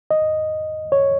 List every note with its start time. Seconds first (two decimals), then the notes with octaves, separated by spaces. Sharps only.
0.11 D#5
0.92 C#5